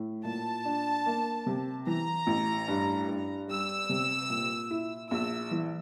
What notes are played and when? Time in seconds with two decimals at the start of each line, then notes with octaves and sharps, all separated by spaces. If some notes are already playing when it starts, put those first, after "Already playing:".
Already playing: A2
0.25 A#2 A5
0.65 D4
1.06 A#3
1.46 C3
1.87 E3 A#5
2.27 A1
2.68 G2
3.08 G2
3.48 G3 E6
3.89 C3
4.30 A#2
4.70 E4
5.11 A#1 E6
5.51 E3